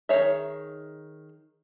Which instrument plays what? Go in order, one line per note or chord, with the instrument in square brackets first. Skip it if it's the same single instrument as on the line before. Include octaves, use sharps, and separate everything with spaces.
[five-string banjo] D#3 C4 G#4 C#5 E5